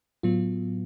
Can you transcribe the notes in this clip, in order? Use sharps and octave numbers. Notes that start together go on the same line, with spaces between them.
A2 F#3 B3 F4